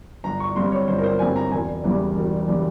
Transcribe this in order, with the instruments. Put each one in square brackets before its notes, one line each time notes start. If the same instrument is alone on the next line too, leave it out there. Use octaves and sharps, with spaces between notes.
[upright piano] G1 A#5
C#6
G2 G3 C4 C6
C#5
G1 C5
A#4
C5
G2 G3 C4 G#5
A#5
E1 G#5
E2 C#3 E3 G3
E1
C#3 E3 G3